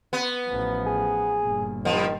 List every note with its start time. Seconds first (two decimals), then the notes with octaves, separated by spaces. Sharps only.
0.13 B3
0.47 A1 F3
0.86 G#4
1.41 G1 A#2
1.85 G2 D#3 F3